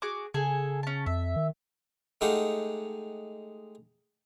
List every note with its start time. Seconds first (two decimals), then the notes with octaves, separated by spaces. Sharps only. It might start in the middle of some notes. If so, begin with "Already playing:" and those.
0.02 F#4 G#4 D6
0.34 C#3 G#4 A4 G#5
0.83 C#4 A5
1.06 F2 E5
1.36 D#3
2.21 G#3 A3 D#4 G4 F5 F#5